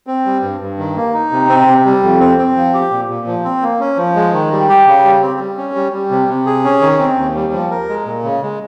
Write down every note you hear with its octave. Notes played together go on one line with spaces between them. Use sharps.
C4
G3
G2
G2
D#3
A#3
D#4
C3
C4
C3
G3
F2
C4
C4
F3
G4
A#2
A#2
F3
C4
A#3
C#4
F3
G#3
D#3
G3
G4
C#3
G3
C4
G3
C#4
G3
G3
C3
C3
G#4
C#4
D#3
C4
D#2
G3
F3
A#4
G#3
A#2
C#3
G#3